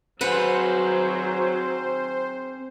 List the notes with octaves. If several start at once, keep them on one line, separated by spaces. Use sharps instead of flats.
F#3 C4 G#4 B4 C5 F#5